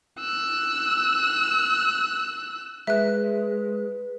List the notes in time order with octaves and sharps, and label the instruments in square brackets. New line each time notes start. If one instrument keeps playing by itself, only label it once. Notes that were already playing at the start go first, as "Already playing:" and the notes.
[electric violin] E6 F#6
[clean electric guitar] G#3 [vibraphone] B4 [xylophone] E5 F#6